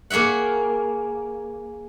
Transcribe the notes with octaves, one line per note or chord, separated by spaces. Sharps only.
A#3 G#4 C#5 E5 F#5